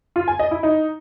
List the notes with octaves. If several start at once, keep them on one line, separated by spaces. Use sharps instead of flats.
F4
G#5
D#5
E4
D#4